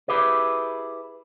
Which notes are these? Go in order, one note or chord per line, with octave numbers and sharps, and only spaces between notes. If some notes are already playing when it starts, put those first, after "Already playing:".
E4 G4 G#4 B4